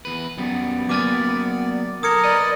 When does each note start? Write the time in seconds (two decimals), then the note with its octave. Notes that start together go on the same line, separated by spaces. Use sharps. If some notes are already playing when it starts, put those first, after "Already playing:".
0.05 E2 B4
0.38 F#2 G3 B3
0.89 F#3 A#3 D5 G#5 D6 F6 A6
2.03 A4 A#4 D#6 G#6 C#7
2.24 B4 D5 D#5